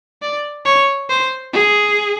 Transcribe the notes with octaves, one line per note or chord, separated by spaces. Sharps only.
D5
C#5
C5
G#4